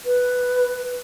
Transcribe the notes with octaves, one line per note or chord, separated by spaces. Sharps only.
B4